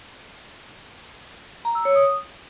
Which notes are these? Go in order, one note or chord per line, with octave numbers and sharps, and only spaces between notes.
A#5
E6
C#5
D#6